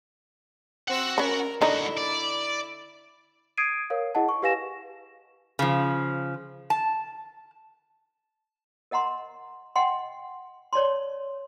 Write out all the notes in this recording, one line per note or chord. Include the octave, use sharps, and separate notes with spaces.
C4 F#4 F#5 E6
C#4 A#4 B5
D3 G#3 D#4 E4 F#4
D5
D#6 G#6 C7 D7 D#7
A#4 C#5 F5
E4 G#4 D#5 F#5 A5
C#6
G4 B4 F5 G#5 A#6 E7
C#3 F3
A5
A#4 D#5 F#5 A#5 C6
D#5 F#5 G5 C6
C#5 D5 A5 C6